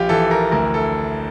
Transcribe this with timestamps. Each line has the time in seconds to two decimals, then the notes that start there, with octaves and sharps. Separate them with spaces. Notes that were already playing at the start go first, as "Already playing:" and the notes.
Already playing: A#1 F4 G4
0.09 E3 A4
0.31 A#4
0.52 D2 A#4
0.74 A4